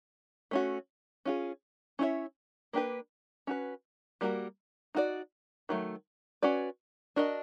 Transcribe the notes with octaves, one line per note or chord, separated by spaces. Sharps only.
A3 C#4 F#4
C#4 F4 G#4
C#4 E4 G#4 C#5 E5
A#3 D4 G4 B4
C#4 F#4 B4
G3 A#3 D4 F#4 A#4
D#4 F#4 A4 D5
D#3 F#3 A3
C#4 F#4 B4 D5
D4 F#4 A#4 D#5